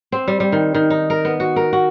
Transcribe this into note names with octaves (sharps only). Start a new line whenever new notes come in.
C4
G3
G3
D#3
D#3
D#4
A#4
B3
F#4
A#4
F#4